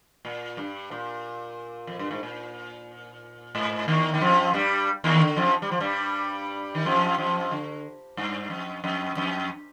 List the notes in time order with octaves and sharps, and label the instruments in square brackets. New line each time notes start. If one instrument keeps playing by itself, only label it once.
[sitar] A#2
G2
A#2
F2
G2
G#2
A#2
G#2
D#2 D#3
D#3
F2 F3
G2 G3
D#2 D#3
D3
F2 F3
G3
F3
G2 G3
D#3
F2 F3
F2 F3
D3
G2
F2
F2
F2